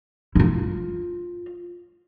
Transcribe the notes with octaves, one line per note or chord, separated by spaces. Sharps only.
E4 F4